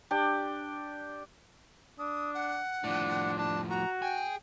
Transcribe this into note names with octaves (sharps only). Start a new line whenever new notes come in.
D4 G4 G5
D4 D#6
F#5
A2 F3 D4
D4 A5
F#4 A#5
G#4 G5